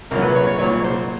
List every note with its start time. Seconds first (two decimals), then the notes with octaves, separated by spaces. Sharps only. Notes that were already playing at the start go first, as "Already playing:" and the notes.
0.11 C2 A#2 F#3 A#4
0.22 B4
0.35 C#5
0.47 C#5
0.59 C2 A#2 F#3 C#5
0.84 C5